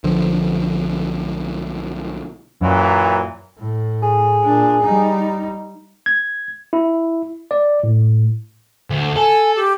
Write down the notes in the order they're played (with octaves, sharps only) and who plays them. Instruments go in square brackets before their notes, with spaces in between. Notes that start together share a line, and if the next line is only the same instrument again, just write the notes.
[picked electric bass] B1 D3 F3
[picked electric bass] F#2 [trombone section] A#2 E3 F#3
[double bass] A2
[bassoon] G#4
[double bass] A#2 D4
G3 D#4
[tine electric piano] G#6
E4
D5
A2
[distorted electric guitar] D2
[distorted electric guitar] A4 [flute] G#5
[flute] G4